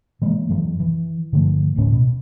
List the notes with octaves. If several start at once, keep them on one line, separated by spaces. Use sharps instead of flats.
E3 G#3 A#3
F#2 E3 F#3
E3
G2 D3 F3 A3
D#1 D2 A2 C#4
B2